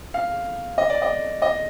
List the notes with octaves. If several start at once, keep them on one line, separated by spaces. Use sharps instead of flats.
F5
D#5
D5
D#5
D#5